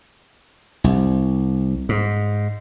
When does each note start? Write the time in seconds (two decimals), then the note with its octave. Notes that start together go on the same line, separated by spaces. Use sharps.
0.84 C2
1.89 G#2